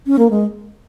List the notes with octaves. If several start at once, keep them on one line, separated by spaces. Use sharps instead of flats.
C#4
A#3
G#3